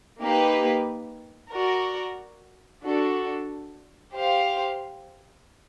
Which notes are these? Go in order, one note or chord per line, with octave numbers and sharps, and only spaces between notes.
A#3 D#4 G4 B4
F#4 A#4 D5
D4 F#4 A4
G4 C5 F5